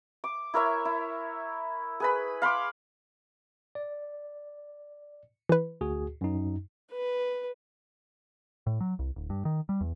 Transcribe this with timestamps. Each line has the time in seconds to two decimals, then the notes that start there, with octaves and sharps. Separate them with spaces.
0.24 D6
0.54 E4 A#4 C#5 E5
0.85 E4
2.00 G#4 B4 B5
2.42 F5 B5 C6 D6
3.75 D5
5.49 E3 B4
5.81 D2 F#4 G#4
6.21 F#2 D#4
6.92 B4
8.67 A2
8.80 F#3
8.99 C2
9.16 D1
9.30 G2
9.45 D#3
9.69 G3
9.81 E2